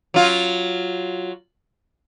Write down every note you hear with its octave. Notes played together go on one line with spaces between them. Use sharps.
F#3 F4